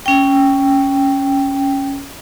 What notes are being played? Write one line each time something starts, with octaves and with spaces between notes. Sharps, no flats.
C#4 G5